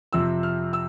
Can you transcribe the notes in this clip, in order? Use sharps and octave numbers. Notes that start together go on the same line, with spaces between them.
F2 C3 F3 C4 E6
F6
E6